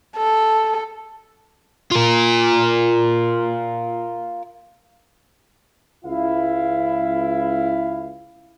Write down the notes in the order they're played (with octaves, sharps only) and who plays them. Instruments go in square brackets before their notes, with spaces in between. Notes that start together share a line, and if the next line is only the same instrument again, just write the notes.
[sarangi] A4
[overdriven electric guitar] F4 A#4
[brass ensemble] C#2 E4 F5